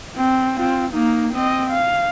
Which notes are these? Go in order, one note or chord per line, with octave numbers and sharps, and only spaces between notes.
C4
C4 F4
A#3 D#4
C4 D#5
F5